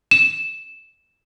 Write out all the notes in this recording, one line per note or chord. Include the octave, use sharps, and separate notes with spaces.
E7